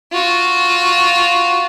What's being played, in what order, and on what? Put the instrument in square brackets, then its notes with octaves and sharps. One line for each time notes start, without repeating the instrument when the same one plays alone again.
[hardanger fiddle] F4 F#4